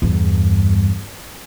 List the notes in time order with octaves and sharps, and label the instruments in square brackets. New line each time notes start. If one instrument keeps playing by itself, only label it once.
[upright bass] E2 G2